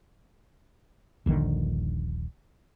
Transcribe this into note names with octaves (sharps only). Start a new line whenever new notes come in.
D#1 A#1 D3 D#3